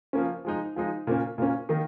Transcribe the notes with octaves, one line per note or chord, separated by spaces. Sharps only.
F3 A#3 C#4
F3 G#3 D#4
F3 G#3 D#4
A#2 A#3 C#4
A#2 A#3 C#4
D#3 A#3 D#4